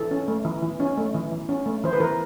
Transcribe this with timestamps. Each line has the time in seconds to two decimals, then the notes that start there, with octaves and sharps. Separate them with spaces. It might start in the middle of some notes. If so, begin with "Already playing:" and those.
Already playing: E3 A4
0.11 C#4
0.28 A3
0.45 E3
0.63 E3
0.80 C#4
0.97 A3
1.14 E3
1.32 E3
1.49 C#4
1.66 A3
1.84 E3 C5
1.93 B4
2.00 E3 A#4